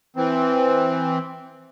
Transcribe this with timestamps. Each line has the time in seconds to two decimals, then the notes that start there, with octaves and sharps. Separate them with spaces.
0.16 E3 C4